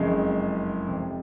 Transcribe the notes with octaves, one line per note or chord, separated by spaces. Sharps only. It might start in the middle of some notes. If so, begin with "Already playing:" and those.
Already playing: F#1 F2 C#3 G#3
F1 F2 C3